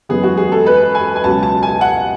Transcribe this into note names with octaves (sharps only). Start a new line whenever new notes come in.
F#2 E3 G#3 B3 G#4
F#4
G#4
A4
B4
G#5
G#5
C#2 B2 F#3 A5
A5
G#5
F#5